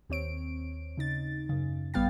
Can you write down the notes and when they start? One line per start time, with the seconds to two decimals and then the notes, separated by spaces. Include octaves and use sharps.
0.09 D#2 C4 C#5 D7
0.97 C#3 D#4 A6
1.49 F#2 C#3
1.94 A1 G3 B3 F5 G5 A6